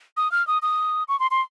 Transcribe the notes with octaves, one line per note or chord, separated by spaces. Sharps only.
D#6
F6
D#6
D#6
C#6
C6
C6